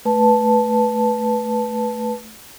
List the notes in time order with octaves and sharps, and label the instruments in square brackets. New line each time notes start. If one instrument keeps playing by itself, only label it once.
[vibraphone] A3 B4 A5